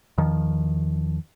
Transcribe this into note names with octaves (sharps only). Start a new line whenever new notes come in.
E2 D#3 F3